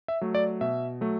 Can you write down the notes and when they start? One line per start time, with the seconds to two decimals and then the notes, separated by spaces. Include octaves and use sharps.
0.08 E5
0.21 F#3 A3
0.35 D5
0.61 B2 E5
1.01 F#3 A3